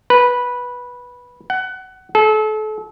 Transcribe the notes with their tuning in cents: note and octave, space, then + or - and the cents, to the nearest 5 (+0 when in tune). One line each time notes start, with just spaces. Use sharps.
B4 -10
F#5 +20
A4 -35